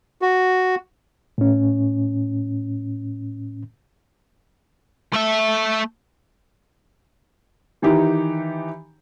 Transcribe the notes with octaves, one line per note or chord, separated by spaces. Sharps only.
F#4
A2 C#4
A3 E5
D#3 E3 D#4 G4